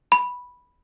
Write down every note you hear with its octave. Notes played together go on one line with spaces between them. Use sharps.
B5